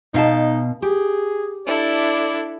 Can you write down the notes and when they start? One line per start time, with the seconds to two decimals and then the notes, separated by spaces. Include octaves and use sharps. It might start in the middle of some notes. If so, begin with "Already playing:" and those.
0.14 B2 D#4 F5 A5
0.82 G4 G#4
1.67 D4 E4 A4 D5